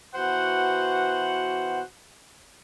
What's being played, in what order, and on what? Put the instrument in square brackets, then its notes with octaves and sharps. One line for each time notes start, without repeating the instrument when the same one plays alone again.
[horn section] B2 E3 F#4 C5 F#5